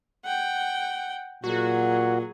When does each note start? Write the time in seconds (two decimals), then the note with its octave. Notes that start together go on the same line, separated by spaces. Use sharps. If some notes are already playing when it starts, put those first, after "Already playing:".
0.25 F#5 G5
1.44 A#2 F#3 F#4 G#4